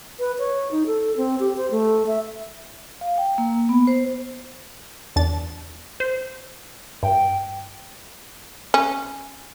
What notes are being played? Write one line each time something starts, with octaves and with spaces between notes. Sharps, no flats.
B4
C#5
D#4
A4
C4
G4
C5
A3
E5
F5
G5
A#3
B3
C5
E2 D4 A6
C5
G2 G5
C#4